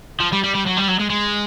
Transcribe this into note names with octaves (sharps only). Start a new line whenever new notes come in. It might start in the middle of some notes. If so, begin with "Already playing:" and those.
F3
G3
G3
G3
F#3
G3
F#3
G#3
G#3